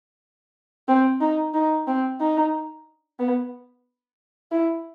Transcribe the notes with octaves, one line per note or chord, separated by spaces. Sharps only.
C4
D#4
D#4
C4
D#4
B3
E4